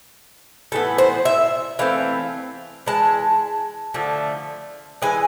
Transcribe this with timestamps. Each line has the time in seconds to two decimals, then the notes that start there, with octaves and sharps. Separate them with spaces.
0.72 A2 E3 B3 A4
0.98 C5
1.25 E5
1.79 E3 A3 C4 F5
2.86 E3 G#3 A5
3.94 D3 F3 A3
5.02 E3 G#3 G#5